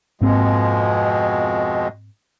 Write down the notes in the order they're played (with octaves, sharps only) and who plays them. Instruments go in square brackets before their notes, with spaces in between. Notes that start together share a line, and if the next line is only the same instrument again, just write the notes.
[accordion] F2 B2 G#3 [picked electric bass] G#2 A#3 C4